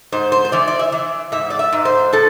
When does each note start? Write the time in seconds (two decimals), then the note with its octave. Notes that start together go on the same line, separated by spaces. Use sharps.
0.12 G#2 C5
0.32 C5
0.45 C5
0.52 E3 D5
0.67 D5
0.79 E5
0.92 E3
1.32 G#2 E5
1.50 D5
1.59 E5
1.72 G#2
1.85 C5
2.13 A2 A4